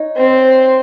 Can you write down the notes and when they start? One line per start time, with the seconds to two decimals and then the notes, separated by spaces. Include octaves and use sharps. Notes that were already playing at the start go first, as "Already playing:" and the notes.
Already playing: D#4 C#5
0.17 C4